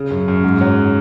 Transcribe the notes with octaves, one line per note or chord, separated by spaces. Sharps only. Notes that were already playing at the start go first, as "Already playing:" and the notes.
Already playing: C#3
F#2
F#2
G#2
F#3